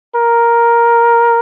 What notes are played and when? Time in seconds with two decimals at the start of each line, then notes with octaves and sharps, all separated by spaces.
0.15 A#4